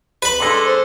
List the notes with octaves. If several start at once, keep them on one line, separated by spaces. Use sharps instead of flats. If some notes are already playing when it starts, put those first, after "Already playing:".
B4 B5
G#3 D4 A4 C6 A#6
C5